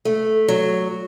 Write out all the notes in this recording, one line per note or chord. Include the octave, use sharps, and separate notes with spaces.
A3
F#3